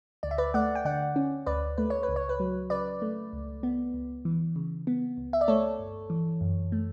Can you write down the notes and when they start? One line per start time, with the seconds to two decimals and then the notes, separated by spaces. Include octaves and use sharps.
0.23 D2 D5
0.31 E5
0.38 B4 D5
0.54 A3 D5 F#5
0.75 G5
0.85 D3 D5 F#5
1.16 C#4
1.46 D2 B4 D5
1.78 A3 B4
1.90 C#5
2.03 B4
2.08 C#2
2.16 C#5
2.29 B4
2.40 F#3
2.70 C#3 B4 D5
3.02 A3
3.33 C#2
3.63 B3
3.94 C#2
4.25 E3
4.56 C#3
4.87 B3
5.17 C#2
5.33 E5
5.41 D5
5.48 A3 A4 C#5
5.79 G1
6.10 E3
6.41 F#2
6.72 A3